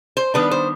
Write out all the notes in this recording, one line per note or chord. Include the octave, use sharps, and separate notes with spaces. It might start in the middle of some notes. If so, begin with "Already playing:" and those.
C5
D#3 G3 B3 D4 B4
C5